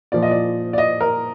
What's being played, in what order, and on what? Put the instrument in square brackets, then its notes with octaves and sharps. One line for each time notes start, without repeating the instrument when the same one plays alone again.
[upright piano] A#2 F3 D5
D#5
D5
D5
D#5
A#4